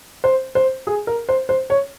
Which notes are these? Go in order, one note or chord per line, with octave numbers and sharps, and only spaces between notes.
C5
C5
G#4
A#4
C5
C5
C#5